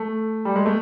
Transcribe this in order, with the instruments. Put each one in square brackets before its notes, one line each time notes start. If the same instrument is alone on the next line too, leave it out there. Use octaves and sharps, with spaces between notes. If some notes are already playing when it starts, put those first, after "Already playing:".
Already playing: [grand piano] A3
G3
G#3
A3